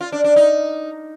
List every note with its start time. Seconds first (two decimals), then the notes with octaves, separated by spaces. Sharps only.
0.01 F4
0.12 D4
0.24 D4
0.36 D#4